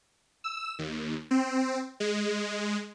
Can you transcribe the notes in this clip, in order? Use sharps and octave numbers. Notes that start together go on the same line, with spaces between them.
E6
D#2
C4
G#3